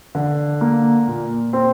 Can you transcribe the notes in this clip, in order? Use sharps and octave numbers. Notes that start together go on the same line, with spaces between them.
D3
A#3
A#2
C4